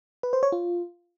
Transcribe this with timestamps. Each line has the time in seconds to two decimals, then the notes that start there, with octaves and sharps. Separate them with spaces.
0.23 B4
0.33 C5
0.43 C#5
0.52 F4